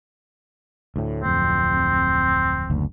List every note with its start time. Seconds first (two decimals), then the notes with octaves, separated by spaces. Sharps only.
0.96 D2 A2
1.23 D1 F2 C4
2.70 F#1 D2